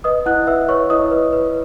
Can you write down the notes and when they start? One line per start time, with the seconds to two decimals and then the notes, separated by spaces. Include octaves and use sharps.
0.04 B4 D#5 D#6
0.26 E4 F#5 F#6
0.47 B4 E5 E6
0.68 B4 C#5 C#6
0.90 E4 D#5 D#6
1.11 B4
1.33 B4